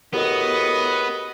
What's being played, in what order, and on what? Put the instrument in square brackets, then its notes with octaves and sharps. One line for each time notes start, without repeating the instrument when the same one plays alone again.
[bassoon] A2 [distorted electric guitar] B3 [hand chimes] F#4 G4 A#4 [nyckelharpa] D#5